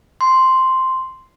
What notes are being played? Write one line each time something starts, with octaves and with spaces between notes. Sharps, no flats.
C6